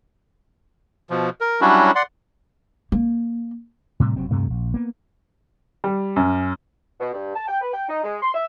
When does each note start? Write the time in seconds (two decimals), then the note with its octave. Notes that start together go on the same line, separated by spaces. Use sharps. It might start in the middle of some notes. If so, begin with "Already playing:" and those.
1.10 B2 F3
1.41 A#4
1.61 F#3 G3 C#4 D4 E4 F#4
1.95 D5 F#5 C6
2.92 A#3
4.00 A2 C3 G3
4.16 F#1 C3 F#3 C4
4.31 D2 G2 C3 A3
4.50 A#1
4.74 A#3 B3
5.84 G3
6.16 F#2
7.00 B2
7.13 G2
7.35 A5
7.48 G5
7.61 B4
7.73 G5
7.89 D#4
8.04 G#3
8.22 C6
8.34 E5